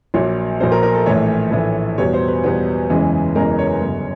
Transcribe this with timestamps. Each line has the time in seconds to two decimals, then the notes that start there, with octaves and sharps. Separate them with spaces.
0.14 A#1 A#2 F#3 C#5
0.60 A#1 A#2 F#3 C5
0.72 A#4
0.83 A#4
0.94 A4
1.06 A#1 A2 E3 A3 C#5
1.51 A#1 A2 E3 A3
1.98 E2 B2 G3 B3 C#5
2.13 C5
2.28 B4
2.44 E2 B2 G3 B3
2.90 F#1 E2 C#3 E3 G#3
3.35 F#1 E2 C#3 E3 G#3 A#4
3.59 C#5
3.81 G1 F#2 C#3